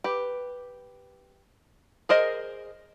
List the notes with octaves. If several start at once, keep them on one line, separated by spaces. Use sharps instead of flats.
G4 B4
G#4 A#4 C5 D#5